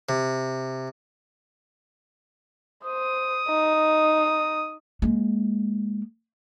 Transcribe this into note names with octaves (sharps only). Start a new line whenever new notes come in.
C3
C5 D#6
D#4
G#3 A#3